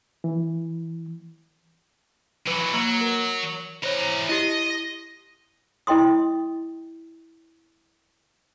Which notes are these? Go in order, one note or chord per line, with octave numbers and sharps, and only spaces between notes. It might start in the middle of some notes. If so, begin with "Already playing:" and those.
E3
E3 F#3 B4 C#7
F#3 A#3 A#5 C#7
A#4
E3 C5 C#5 A#5
E4 G4 D#5
E4 D#5 G5 C6 D#6